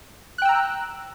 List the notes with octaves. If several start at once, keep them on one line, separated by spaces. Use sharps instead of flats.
G5 A#5 E6 F#6